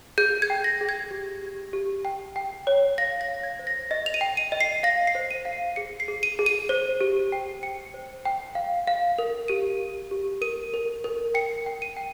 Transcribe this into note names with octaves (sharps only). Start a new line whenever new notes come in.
G#4 G6
G#6
G5
A#6
G#4
G#6
G4
G4
G4
G5
G5
C#5
F5 A#6
A#6
F5
G#6
C5
A#6
D#5 A#6
F7
D#7
G5
D#7
D#5
C7
F5 A#6
C7
C5
D#7
F5
C7
G#4 C#7
C7
G#4
D#7
G#4
D#7
C5
G4
G5
G5 C#7
C5
G5
F5
F5
A#4
G4 D#7
G4
G4
A#4 D#7
A#4
A#4
G5 C#7
G5
D#7
G5